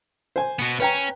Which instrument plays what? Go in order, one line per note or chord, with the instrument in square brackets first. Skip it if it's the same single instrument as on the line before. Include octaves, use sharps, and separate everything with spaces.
[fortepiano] C5 G#5
[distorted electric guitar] B2 B3
[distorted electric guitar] C#4 [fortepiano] B4 G5 A#5